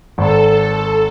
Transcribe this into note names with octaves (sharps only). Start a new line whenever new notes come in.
G#1 A4